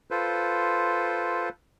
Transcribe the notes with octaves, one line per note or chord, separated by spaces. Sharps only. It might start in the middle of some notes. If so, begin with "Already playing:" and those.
F4 A4 B4 C5